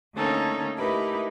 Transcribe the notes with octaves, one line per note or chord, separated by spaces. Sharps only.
D3 A3 A#3 C#4 D#4 A4
A3 D#4 E4 G4 A#4 B4